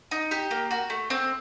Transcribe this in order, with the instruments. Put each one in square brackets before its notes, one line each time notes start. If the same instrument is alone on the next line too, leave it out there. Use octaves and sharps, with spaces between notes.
[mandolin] D#4
G4
A#3
F#4
A3
C4